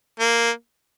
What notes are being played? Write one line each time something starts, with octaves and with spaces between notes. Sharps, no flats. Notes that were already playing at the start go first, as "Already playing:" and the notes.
A#3